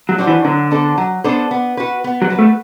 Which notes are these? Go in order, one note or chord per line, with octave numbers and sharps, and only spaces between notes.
F#3
D4 F#4 C5
E3
D3 F#3
B3 D4 A4 C5
F#3
B3 D4 A4 C5
B3
F#4 B4
B3
F#3
F#4 B4
A3